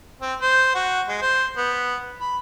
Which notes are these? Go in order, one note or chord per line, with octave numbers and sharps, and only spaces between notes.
C4
C5
F#4
G#3
C5
B3
B5